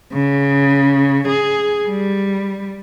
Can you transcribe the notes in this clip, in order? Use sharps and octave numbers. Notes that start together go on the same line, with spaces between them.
C#3
G#4
G3